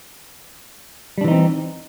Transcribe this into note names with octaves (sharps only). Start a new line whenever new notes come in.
E3 G3 C4 D4 D#4